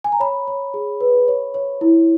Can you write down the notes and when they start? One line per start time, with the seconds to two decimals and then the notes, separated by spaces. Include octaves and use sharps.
0.04 G#5
0.12 A#5
0.20 C#5 B5
0.48 C#5
0.74 G#4
1.01 B4
1.28 C#5
1.54 C#5
1.81 E4